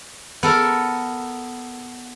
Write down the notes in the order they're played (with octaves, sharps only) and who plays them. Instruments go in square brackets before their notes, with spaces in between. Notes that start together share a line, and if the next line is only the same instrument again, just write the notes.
[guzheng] B3 A4 A#4